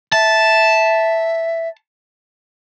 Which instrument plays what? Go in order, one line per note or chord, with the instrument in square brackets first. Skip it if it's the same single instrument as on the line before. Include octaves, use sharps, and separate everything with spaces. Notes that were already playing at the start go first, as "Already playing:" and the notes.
[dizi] E5 [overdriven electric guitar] A5